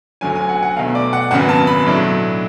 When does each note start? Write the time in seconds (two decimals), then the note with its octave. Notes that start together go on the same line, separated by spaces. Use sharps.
0.21 D2 D3 F#3 C#4 G#5
0.35 G#5
0.49 F#5
0.63 F#5
0.76 B1 B2 A3 F5
0.95 D5
1.13 F#5
1.31 G#1 F#2 C#3 F#3 B3 F#5
1.49 A5
1.67 B5
1.86 B1 A2 F#3 A3 D4